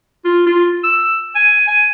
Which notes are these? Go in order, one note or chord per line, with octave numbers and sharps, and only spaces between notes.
F4
F4
E6
G#5
G#5